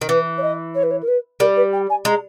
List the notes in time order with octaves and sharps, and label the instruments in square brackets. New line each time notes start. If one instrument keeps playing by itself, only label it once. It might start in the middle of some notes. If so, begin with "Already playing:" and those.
[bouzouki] D#3
[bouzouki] E3 [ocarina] B4
[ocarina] C#5
D#5
C#5
B4
C#5
A#4
B4
[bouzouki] G3 [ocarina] A#4
[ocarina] B4
G5
G#5
[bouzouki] G#3 [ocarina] A#5